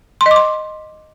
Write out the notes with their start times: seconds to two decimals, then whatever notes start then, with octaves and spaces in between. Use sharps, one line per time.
0.21 C6
0.26 D#5
0.31 D6
0.36 C6